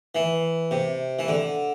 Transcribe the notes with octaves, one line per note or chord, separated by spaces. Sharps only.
E3
C3
E3
D3